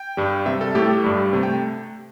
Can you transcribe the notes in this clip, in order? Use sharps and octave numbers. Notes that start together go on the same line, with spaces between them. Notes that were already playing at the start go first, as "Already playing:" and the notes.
Already playing: G5
G2 G3
C3 G3 E5
A4
A2 A3 G4
A4
G4
G2 G3
C3 A3
G5